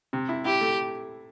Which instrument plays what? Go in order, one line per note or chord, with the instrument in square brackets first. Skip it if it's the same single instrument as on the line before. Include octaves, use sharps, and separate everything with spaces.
[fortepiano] C3
E4
[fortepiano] E4 [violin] G4
[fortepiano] A3